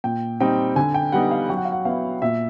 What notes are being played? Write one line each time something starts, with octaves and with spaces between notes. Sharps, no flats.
A#2 G5
G3 C4 D#4 G5
D3 G#5
G5
G3 B3 D#4 F#5
F5
F#3 G5
F#5
F5
F#5
B3 E4 F5
A#2 E5